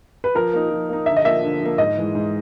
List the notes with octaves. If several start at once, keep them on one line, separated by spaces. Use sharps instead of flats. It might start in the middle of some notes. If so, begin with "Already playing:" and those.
B4
F3 A#4
A#3 D#4
F3
A#3 D#4
D3 E5
D#5
F3 A#3 E5
D3
F3 A#3
G#2 D#5
E3 G#3
G#2